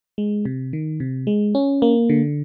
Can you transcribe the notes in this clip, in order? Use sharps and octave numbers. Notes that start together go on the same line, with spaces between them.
G#3
C3
D#3
C3
G#3
C#4
A#3
D3